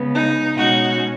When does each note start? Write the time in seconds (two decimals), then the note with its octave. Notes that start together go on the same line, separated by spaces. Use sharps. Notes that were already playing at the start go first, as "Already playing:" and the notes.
Already playing: C#3 G#3 B3
0.15 D#4
0.56 B2 G#3 C#4 D#4 F#4